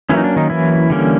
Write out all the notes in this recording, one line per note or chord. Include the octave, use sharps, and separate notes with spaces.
E3 F#3 A#3 C#4 E4
D#4
D4
D#3 D#4
E3 E4
D3 G3 A#3 C#4